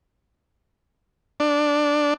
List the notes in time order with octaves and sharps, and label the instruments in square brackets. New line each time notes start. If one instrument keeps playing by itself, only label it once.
[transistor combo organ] D4